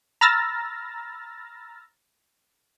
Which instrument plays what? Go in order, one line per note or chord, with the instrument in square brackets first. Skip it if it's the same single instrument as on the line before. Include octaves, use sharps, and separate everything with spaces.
[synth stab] A#5 B5 E6 F6 A6 A#6